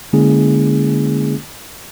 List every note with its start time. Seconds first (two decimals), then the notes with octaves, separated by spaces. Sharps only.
0.13 D3 G#3 A#3 C#4 E4 G#4